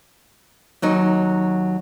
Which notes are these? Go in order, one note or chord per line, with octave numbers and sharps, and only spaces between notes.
D#2 F#3 D#4